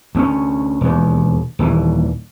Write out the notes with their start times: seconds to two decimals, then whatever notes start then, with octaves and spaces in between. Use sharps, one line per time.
0.15 D2 A#3 C#4
0.81 E1 D#2
1.59 D#1 D#2 E3